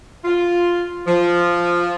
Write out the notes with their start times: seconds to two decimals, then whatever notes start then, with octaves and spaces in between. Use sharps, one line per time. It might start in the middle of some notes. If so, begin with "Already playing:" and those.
0.25 F4
1.07 F3